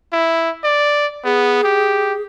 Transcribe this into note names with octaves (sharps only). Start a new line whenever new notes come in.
E4
D5
B3 G#4
G4